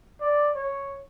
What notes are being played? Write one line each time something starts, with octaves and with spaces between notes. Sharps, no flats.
D5
C#5